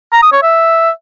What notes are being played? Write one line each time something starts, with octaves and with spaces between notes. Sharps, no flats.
A#5
D#6
C#5
E5